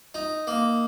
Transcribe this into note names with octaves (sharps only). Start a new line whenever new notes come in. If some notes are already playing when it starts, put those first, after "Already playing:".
D#4
A#3